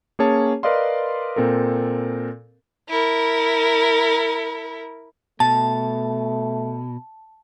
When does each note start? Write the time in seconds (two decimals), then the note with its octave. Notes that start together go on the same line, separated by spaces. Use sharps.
0.19 A#3 C#4 G#4 C#5 A5
0.63 A#4 B4 D5 D#5 F5 C6
1.36 A#2 C4 A4 A#4
2.89 E4 A#4
5.40 B2 A3 A5